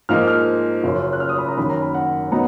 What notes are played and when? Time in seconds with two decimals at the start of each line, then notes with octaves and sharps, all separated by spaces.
0.09 G#2 F3 A#3 D#4 F6
0.28 F6
0.83 F#1 F#2 F3
1.13 F#6
1.20 F6
1.29 D#6
1.38 B5
1.48 A#5
1.57 F#2 D#3 A#3 C#4 B5
1.70 A#5
1.82 B5
1.94 F#5
2.32 F#3 B3 D#4 A#5